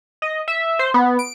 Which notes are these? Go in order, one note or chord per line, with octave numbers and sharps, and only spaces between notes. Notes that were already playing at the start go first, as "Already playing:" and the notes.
D#5
E5
C5
B3
D7